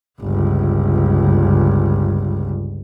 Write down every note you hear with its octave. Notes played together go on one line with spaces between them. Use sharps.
G1 C#2